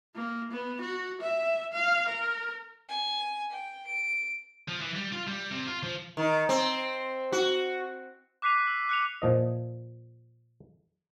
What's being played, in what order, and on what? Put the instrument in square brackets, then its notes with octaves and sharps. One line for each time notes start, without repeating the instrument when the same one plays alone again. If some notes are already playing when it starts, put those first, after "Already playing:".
[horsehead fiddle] A#3
B3
F#4
E5
F5
A#4
[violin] G#5
G5
D7
[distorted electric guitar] F3
E3
G3
F4
G3
C3
F4
F3
[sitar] D#3
C4
F#4
[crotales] D6 F#6 B6 C7 D#7 F7
E6
F#6 C#7 F7
[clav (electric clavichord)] A#2 F3 D#5